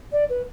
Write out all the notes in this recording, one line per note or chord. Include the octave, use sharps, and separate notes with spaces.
D5
B4